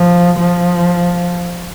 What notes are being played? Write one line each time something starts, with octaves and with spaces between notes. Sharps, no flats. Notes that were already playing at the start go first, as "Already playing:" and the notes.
Already playing: F3
F3